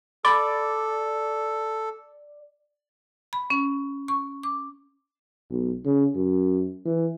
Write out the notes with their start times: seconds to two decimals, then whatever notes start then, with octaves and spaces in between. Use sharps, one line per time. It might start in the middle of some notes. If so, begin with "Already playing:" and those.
0.25 A4 D5 B5
3.33 B5
3.50 C#4
4.08 C#6
4.43 D6
5.51 B1
5.86 C#3
6.15 F#2
6.86 E3